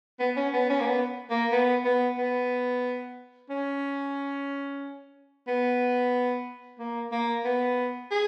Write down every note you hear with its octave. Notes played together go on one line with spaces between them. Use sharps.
B3
C#4
B3
C#4
A#3
B3
A#3
B3
B3
B3
C#4
B3
A#3
A#3
B3
G#4